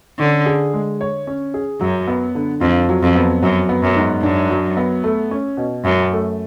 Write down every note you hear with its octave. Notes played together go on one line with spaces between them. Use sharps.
D3 C#4
G#4
G#3
C#5
C#4
G#4
F#2 F#3
B3
D3
F2 F4
F#3
F2
B3
F#2 F#3
B3
F#2
G#2
F#2 D4
F#3
B3
A3
C#4
B2
F#2 F#4
A3